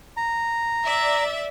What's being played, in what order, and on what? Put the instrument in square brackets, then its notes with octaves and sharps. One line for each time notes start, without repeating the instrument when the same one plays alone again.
[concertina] A#5
[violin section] D5 E5